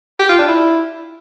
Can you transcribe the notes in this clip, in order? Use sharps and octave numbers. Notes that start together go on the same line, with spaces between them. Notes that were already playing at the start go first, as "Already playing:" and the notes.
G4
F4
D4
E4